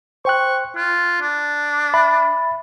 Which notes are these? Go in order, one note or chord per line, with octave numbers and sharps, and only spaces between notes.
C5 G5 C#6 F#6
F4 F#6
D4
E5 B5 A6